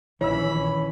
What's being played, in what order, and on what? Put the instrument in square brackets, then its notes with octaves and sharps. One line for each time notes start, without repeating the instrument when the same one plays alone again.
[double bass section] A#1 D#3 C#4 [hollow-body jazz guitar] E3 [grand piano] C#5 E6 [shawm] B5